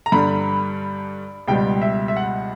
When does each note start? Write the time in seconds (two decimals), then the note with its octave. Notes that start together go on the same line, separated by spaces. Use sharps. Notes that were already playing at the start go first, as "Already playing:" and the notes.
0.06 A#5
0.12 G2 D3 G3 B5
1.48 C#2 B2 G3 G5
1.82 E5
2.08 E5
2.16 F#5